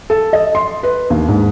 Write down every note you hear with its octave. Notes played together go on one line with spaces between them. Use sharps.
A4
D#5
C6
B4
D#2
G#2